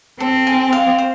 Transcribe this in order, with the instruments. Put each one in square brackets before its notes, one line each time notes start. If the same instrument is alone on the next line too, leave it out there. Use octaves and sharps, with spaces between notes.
[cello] C4 [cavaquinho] A4
[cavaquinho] G#5
F5
C5